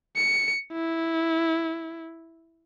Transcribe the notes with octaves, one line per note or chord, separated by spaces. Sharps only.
C#7
E4